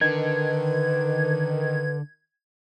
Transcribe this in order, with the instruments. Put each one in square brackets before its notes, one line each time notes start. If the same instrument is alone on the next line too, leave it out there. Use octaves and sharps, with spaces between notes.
[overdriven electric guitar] D3 [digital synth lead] D#3 [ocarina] B4 [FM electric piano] G#6